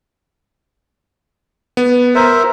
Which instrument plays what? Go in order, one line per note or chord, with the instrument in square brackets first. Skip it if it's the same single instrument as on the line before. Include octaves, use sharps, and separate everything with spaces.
[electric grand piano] B3
[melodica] A#4 C5 E5